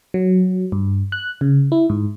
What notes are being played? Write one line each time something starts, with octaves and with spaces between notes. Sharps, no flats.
F#3
G2
F#6
C#3
E4
G#2